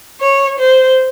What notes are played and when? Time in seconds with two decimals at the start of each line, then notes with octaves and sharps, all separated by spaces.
0.20 C#5
0.58 C5